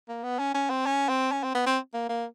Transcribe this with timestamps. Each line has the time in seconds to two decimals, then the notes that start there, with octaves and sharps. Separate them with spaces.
0.09 A#3
0.23 B3
0.39 C#4
0.55 C#4
0.70 C4
0.86 C#4
1.09 C4
1.32 C#4
1.44 C4
1.55 B3
1.66 C4
1.94 A#3
2.09 A#3